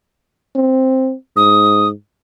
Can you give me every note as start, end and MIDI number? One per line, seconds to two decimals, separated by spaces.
0.56 1.14 60
1.37 1.91 44
1.37 1.88 87